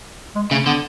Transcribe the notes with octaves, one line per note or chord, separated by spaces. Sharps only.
G#3
C#3 A3
D3 B3